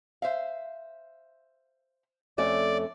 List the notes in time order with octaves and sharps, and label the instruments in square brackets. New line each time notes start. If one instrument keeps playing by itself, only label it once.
[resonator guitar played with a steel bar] C5 E5 F5
[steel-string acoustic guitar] F2 A3 C#4 [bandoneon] D5